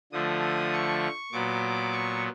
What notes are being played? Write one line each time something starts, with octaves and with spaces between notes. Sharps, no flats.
D3 F3 A3 D#6
C#6
A#2 F#3 B3 D6
C#6